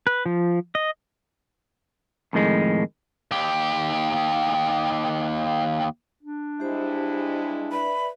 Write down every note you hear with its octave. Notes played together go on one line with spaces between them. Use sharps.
B4
F3
D#5
F2 A2 D#3 G#3
D#2 G4
D4
G2 G#3 E4 G4 C5
B4 D5 E5 B5